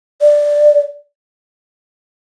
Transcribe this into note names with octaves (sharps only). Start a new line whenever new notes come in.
D5